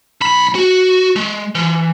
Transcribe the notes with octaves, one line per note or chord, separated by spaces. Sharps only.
B1 B5
F#4
G#3
E3